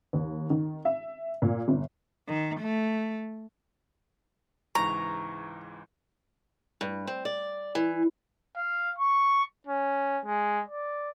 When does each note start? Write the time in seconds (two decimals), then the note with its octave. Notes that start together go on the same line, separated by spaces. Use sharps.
0.13 D#2
0.50 D#3
0.85 E5
1.42 A#2
1.68 G1
2.27 D#3
2.60 A3
4.75 C#2 G#2 E3 A#5 C#6
6.81 G2
7.07 C4
7.25 D5
7.75 E3
8.56 F5
8.99 C#6
9.67 C#4
10.26 G#3
10.68 D5